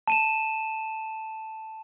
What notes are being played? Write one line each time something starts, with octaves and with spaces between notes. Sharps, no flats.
A5 D#7 E7